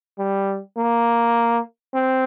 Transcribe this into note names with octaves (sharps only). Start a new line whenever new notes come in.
G3
A#3
C4